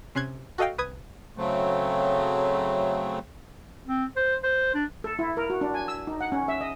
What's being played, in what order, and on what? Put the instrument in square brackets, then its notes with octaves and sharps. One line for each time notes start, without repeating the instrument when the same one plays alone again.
[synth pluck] C3 C#4 C6 F#6 G#6
F#4 A4 D#5 F5 G5
C2 B4 D#6 G#6
[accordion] C#3 F#3 A3 C4
[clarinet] C4
C5
C5
D4
[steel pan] A4
E4
A#4
F#4
D4
G#5
E6
D#4
F#5
C#4
E5
D#5